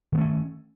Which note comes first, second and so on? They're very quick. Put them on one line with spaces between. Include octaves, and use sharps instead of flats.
D#3 B3 A3 C#4